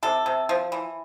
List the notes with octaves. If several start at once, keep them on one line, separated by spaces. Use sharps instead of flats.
C3 A4
C3
F3
E3